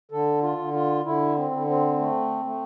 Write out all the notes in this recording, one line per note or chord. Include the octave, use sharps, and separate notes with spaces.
D3 A4
F4
D3
F4
D3 E4
C4
D3
C4
A3
A3